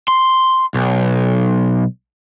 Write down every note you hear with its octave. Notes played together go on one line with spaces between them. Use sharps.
C6
B1